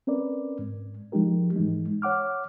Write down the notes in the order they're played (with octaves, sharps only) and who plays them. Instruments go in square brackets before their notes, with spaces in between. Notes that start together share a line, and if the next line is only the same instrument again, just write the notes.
[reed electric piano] C4 C#4 A#4 B4 D5
G#2
F3 G#3 D#4 G4 A#4
G#2 E3 G#3 D#4
C#5 F#5 D6 F6